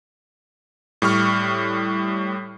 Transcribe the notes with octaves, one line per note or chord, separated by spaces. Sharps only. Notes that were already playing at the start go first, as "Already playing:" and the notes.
A2 G3 C#6 F6